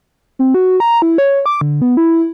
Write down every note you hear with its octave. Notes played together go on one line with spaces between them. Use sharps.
C4
F#4
A#5
E4
C#5
D6
D3
B3
E4